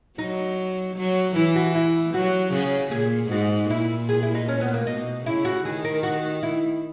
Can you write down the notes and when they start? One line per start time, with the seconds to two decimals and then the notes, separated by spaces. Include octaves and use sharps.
0.18 F#3 D#4
0.96 F#3
1.36 E3 E4
1.56 F#4
1.75 E4
2.14 F#3 F#4
2.52 C#3 F#4
2.91 A#2 G#4
3.30 G#2 F#4
3.70 A#2 E4
4.09 G#4
4.22 E4
4.35 D#4
4.48 C#4
4.61 B3
4.74 A#3
4.86 B2 D#4
5.25 C#3 E4
5.45 F#4
5.65 D#3 G#4
5.84 A#4
6.03 F#4
6.43 E4